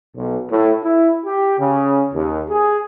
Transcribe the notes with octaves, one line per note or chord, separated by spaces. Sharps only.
B1
A2
E4
G4
C#3
D#2
G#4